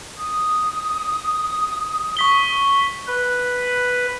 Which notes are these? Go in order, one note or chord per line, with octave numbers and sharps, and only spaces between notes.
D#6
C#6 B6 G7
B4